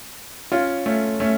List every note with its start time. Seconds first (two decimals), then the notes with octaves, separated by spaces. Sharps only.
0.52 C#4 F4
0.86 A3 C#4
1.20 A3 C#4